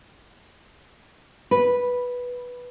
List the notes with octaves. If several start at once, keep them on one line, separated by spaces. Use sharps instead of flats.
B4